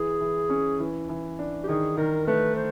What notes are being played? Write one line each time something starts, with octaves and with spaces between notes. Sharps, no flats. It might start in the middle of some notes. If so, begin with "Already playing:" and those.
Already playing: E3 G#4
E3
C#4
E3
E3
D4
G4
D#3 G#4
D#3 A#4
A3 B4
C5